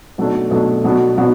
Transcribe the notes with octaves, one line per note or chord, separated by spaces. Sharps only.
B2 F#3 A3 D4
B2 F#3 A3 D4
B2 F#3 B3 D4 F#4
B2 F#3 B3 D4 F#4